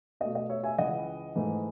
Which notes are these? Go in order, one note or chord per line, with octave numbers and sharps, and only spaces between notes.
B2 A3 D#5
D#5
C#5 E5
E5 G#5
C#2 C#3 E3 G#3 D#5 F#5
G#2 E3 A3